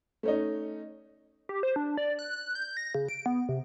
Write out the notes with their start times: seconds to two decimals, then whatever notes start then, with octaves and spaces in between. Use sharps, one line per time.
0.23 A3 C#4 D#4
1.49 G4
1.63 C5
1.76 D4
1.97 D5
2.19 F#6
2.33 F#6
2.55 G6
2.77 A#6
2.95 C#3
3.08 D7
3.26 B3
3.49 C3